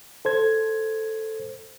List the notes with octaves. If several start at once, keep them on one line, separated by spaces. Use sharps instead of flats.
A4 C5 G#6